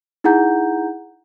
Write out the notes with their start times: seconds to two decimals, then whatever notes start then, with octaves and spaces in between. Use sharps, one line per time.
0.24 D#4 E4 G#4 F#5 A#5 G6